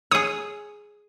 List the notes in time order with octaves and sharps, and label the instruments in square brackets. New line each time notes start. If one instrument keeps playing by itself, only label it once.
[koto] G#4 C#5 [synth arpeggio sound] D#6